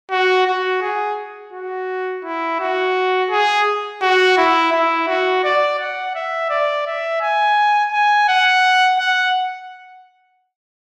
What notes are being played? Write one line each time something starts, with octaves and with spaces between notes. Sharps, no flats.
F#4
F#4
G#4
F#4
E4
F#4
G#4
F#4
E4
E4
F#4
D5
F#5
E5
D5
E5
G#5
G#5
F#5
F#5